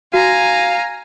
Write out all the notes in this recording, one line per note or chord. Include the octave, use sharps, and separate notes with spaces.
F#4 F5 G#5 A#5